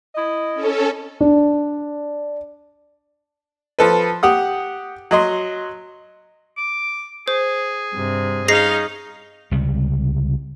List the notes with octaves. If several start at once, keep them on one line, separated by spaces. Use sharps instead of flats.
E4 D#5
C#4 A4
D4
F3 A4 B4
G4 F#5 D#6
F#3 D#5 C6
D6
G#4 C5
G2 C3
C#4 D#4 G#4 D#5 F5 A#6 C7
C#2 C3 G3